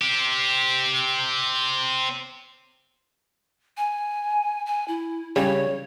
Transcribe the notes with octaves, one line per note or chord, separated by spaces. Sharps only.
C4 G4
G#5
G#5
E4
C#3 G3 C#5